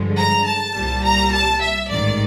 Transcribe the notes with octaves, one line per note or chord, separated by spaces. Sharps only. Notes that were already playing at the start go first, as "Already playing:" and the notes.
Already playing: G2 D3 F3 G#3
A#5
A5
C2 A#2 G3
A#5
A5
E5
A1 G#2 D#3 D5